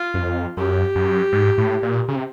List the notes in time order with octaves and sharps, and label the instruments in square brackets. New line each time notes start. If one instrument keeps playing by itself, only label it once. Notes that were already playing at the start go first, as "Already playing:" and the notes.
Already playing: [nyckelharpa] F4
[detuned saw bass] F#2
F2
[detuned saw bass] F#2 [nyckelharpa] G4
[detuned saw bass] F#2
G#2
A2
A#2
C#3
C3